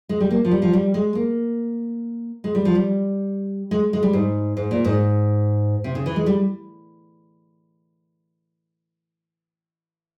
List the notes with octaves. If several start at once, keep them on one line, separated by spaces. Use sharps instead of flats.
G#3
G3
A#3
F3
G3
F3
G3
G#3
A#3
G#3
G3
F3
G3
G#3
G#3
G3
G#2
G#2
A#2
G#2
C3
C#3
E3
G#3
G3